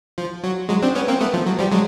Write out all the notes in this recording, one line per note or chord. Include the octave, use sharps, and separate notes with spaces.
F3
F#3
F#3 G#3
C4 D4
B3 C#4
A#3 C4
A3 B3
F3
F#3
F3 G3
F#3 G#3